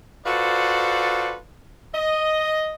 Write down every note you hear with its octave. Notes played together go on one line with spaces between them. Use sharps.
F4 F#4 A4 B4 C5 D5
D#5